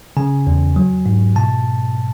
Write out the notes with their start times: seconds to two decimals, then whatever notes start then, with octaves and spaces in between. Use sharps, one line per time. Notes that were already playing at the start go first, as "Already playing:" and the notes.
0.17 C#3 G#5
0.47 E2
0.76 F#3
1.06 G#2
1.35 B2 A5